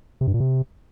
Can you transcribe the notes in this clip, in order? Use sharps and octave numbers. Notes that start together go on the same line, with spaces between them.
C3
G2
A#2
C3